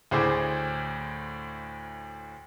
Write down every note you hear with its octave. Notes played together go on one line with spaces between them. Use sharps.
D2 A2 G#4 C5 D6